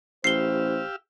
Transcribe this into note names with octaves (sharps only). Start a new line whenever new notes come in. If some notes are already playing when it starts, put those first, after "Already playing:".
A1 G4 C5 F5 E6 C7 G7